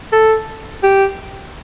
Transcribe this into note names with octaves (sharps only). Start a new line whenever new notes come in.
A4
G4